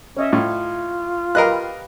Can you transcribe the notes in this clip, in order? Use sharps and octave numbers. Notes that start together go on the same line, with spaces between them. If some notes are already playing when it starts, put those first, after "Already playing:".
C#4 C#5 D#5 E5
A2 F4
G4 A#4 B4 D#5 F5 F#6